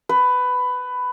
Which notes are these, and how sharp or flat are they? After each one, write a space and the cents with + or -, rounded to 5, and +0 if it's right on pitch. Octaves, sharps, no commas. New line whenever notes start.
B4 +15